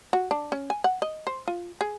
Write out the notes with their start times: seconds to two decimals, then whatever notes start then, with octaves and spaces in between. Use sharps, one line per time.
0.13 F#4
0.31 D4
0.52 C#4
0.70 G#5
0.84 F#5
1.02 D#5
1.27 C5
1.48 F4
1.81 G#4